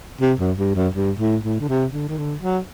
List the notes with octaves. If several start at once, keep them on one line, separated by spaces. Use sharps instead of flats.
C3
F#2
G2
F#2
G2
A2
A2
D3
C3
D3
D#3
D3
F#3